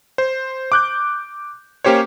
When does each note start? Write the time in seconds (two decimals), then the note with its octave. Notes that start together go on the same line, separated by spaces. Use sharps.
0.18 C5
0.72 D6 F#6 G6
1.84 A#3 C#4 G4 C5 C#5